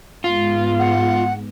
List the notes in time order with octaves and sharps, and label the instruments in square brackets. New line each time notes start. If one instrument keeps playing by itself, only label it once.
[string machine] G#2 G#3 B3 [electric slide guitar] F4
[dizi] F#5